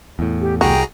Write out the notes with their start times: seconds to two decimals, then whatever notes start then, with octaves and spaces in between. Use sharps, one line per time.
0.19 E2 A2
0.41 G4
0.61 C2 F#4 G#4 G5 A#5